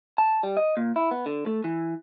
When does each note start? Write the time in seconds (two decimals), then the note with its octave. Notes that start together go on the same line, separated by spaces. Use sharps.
0.18 A5
0.43 G3
0.57 D#5
0.77 A#2
0.96 E4
1.11 B3
1.26 D3
1.46 A3
1.64 E3